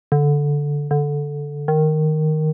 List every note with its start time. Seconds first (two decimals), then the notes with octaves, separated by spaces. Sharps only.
0.12 D3
0.91 D3
1.68 D#3